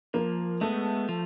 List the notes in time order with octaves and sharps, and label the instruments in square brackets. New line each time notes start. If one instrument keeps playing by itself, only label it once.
[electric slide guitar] F3 [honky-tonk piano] A#3
[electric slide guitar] G#3 B3 [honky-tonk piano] A3
[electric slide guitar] F3